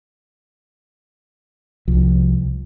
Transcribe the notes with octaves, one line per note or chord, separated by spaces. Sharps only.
C2 F3